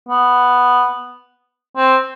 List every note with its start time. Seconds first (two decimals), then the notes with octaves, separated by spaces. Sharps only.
0.09 B3
1.77 C4